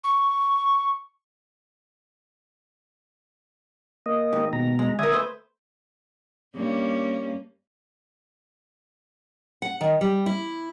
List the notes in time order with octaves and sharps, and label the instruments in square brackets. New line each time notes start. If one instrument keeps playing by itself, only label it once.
[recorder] C#6
[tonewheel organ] A#3 D#5
[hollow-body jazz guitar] D#2 G#2
[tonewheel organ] B2 A#5
[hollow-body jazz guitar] G#3
[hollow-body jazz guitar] D3 A#4 [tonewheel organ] E5 G#5 D#6
[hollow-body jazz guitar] A3 B4 C5
[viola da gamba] G2 A#3 C#4
[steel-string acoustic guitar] F#5
D#3
G3
E4